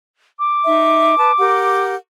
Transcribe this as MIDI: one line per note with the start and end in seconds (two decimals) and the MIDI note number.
0.39 1.85 86
0.65 1.18 63
0.65 1.18 76
1.18 1.31 71
1.18 1.31 81
1.39 1.95 67
1.39 1.95 70
1.39 1.95 78